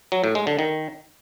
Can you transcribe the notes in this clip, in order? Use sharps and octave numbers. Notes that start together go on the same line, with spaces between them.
F#3
A2
G#3
D3
D#3